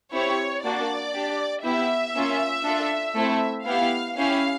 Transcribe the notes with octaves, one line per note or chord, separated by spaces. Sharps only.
C4 E4 G4 C#5
A#3 D4 F#4 D5
D4 G4
B3 E4 G4 E5
A#3 C#4 F4
D4 F4 A4
A3 C4 E4 A4
B3 E4 G4 F5
C#4 E4 G4 F5